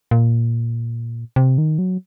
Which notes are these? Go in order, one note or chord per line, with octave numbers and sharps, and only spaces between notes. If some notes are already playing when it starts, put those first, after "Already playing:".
A#2
C3
D#3
F#3